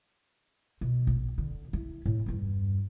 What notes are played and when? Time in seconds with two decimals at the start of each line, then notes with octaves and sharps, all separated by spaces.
0.81 B2
1.07 A#1
1.38 D3
1.73 E4
2.06 A2
2.26 E2 G2